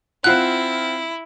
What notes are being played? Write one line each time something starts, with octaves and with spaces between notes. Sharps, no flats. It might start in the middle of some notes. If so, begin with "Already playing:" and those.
C4 E4 F4 F#5 F#6